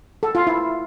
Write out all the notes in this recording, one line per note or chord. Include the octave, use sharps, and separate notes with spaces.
A4
F4
E4